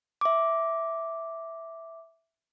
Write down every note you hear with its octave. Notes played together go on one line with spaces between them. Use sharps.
E5 D6